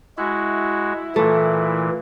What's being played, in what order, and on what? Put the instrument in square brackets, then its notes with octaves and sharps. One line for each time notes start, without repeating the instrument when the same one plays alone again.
[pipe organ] G#3 F#4 [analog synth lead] E4
[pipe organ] A#2 E3 [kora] A3